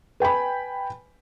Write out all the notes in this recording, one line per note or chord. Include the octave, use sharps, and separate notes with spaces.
B4 G5 G#5 B5